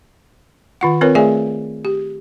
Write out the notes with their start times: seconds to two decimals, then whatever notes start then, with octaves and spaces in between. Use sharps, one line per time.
0.81 D#3 F4 F#5
1.01 C4 F4 A#4 B4 C#5
1.15 A3 G#4 D5 E5 G#5
1.85 G4